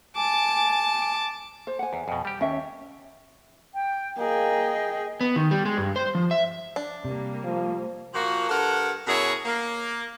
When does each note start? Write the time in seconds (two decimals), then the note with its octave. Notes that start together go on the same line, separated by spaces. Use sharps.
0.16 G#5 A5 D6
1.67 C5
1.79 F#5 G#5
1.93 E2
2.08 F2 B2
2.25 G3 G4
2.41 D#2 C#4 E5
3.74 G5
4.18 A#3 G#4 D#5 G5
5.21 B3
5.36 D#3
5.51 G3
5.65 G#3
5.77 G2
5.96 C5
6.15 F3
6.31 E5
6.76 D4
7.05 C3 G3 A#3
7.44 F3
8.14 A#2 F3 A#3 F#4
8.49 G2 A4 A#4 F#5
9.07 F#2 B2 E4 G#4 A#4 C#5
9.46 A#3